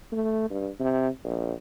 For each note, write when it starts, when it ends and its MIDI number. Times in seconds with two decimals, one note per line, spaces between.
0.12 0.49 57
0.50 0.68 43
0.80 1.09 48
1.25 1.52 34